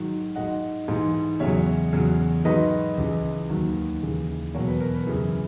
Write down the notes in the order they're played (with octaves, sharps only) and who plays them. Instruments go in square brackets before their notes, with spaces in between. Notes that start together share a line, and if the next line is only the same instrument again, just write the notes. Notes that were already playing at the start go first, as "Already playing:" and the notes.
Already playing: [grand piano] G#2 D#3 F#3
G#2 F#3 D#5 F#5
G#2 E3
E2 C#3 F#3 C#5 E5
E2 C#3 F#3
G#2 D#3 F#3 B4 D#5
C#2 C#3 E3
D#2 D#3 F#3
D#2 C#3 E3
E2 B2 F#3 A#4 C#5
B4
A#4
B4
F#2 C#3 E3